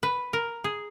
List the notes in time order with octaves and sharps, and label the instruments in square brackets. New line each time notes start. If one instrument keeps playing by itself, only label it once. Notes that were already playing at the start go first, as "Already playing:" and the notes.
[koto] B4
A#4
G#4